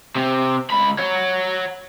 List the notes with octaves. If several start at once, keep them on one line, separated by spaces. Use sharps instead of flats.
C3
C#2 B5
C#5 F#5